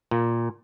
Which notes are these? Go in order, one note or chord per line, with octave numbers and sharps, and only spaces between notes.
A#2